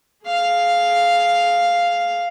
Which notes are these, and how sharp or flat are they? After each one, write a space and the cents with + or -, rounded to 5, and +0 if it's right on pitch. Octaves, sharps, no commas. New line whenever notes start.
G#4 +20 F5 +0